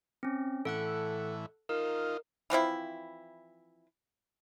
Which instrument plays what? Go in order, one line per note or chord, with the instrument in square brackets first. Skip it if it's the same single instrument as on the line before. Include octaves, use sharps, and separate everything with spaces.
[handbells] C4 C#4
[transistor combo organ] A2 E3 [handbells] A4 F#5 F#6
[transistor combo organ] D#4 F4 [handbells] A#4
[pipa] E3 F3 C4 E4